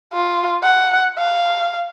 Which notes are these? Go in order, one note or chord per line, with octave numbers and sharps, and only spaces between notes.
F4
F#5
F5